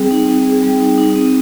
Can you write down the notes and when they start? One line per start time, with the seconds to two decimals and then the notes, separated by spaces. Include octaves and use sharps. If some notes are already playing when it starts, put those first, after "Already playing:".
Already playing: G3 C4 G#4
0.11 D#4
0.28 C4
0.46 G#4
0.63 G3
0.80 D#4
0.97 D#4
1.15 C4